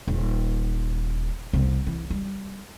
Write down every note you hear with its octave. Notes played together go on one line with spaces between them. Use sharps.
D#1
C2 B3
E3
G3